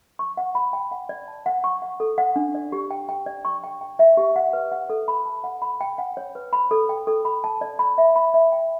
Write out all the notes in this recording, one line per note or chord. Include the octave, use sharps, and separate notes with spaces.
C#6
F#5
B5
G5
F#5
D5
A5
F#5
C#6
F#5
A4
F#5
D4
D5
G4
G5
G5
D5
C#6
G5
G5
E5
G4
F#5
B4
F#5
A4
B5
A5
F#5
B5
G5
F#5
C#5
B4
B5
A4
G5
A4
B5
A5
D5
B5
E5
B5
E5
G5